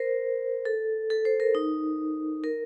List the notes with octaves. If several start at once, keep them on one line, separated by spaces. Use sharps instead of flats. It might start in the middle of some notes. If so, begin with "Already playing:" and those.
Already playing: A#4 C5
A4
A4
C5
A#4
D#4
A#4